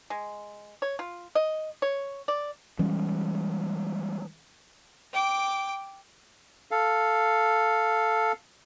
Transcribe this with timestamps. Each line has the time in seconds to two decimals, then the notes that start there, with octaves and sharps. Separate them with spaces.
0.10 G#3
0.82 C#5
0.99 F4
1.35 D#5
1.82 C#5
2.28 D5
2.79 E3 G3 G#3 C#4
5.14 G5 D6
6.71 A4 F5